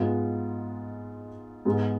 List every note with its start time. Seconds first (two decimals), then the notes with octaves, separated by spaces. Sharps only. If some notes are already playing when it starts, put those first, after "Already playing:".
Already playing: G#2 G#3 B3 F4
1.65 G#2 G#3 B3